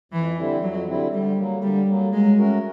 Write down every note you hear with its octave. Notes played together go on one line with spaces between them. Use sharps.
F2 E3
D3 G3 C4 E4
F2 F#3
D3 G3 C4 E4
D3 G3
F#3 A#3
D3 G3
F#3 A#3
F#3 G#3
A3 C#4 F#4 A#4